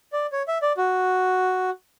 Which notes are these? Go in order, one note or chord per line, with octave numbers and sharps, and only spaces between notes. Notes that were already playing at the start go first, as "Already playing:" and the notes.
D5
C#5
E5
D5
F#4